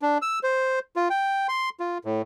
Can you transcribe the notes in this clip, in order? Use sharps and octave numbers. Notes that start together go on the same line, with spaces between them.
D4
E6
C5
F4
G5
C6
F4
A2